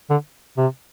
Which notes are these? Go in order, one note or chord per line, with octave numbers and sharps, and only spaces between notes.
D3
C3